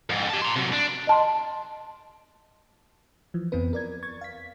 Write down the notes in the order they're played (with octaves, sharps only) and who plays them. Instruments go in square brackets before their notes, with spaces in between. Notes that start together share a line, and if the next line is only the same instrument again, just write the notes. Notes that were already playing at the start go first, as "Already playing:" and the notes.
[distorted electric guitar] F2 G#2
G4 A5
A#5 C6
C3 F#3
D4
[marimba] D#5 A5 C6
[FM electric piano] E3 F3
F2 E3 B3 C4 B4
A#4 D5 G#6
C#6 G#6 A6
F5 B6